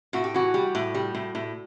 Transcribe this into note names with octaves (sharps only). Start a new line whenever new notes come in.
A2 F#4
G4
E3 F#4
G3
A2
G3
A2
A2